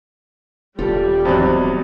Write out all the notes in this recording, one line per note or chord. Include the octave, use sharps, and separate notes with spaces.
D#1 G3 F4 G4 A4
E2 G#2 F#3 C4